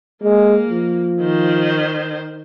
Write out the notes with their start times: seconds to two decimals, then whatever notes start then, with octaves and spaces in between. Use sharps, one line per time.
0.23 G#3 A#3
0.70 F3
1.21 D#3 C5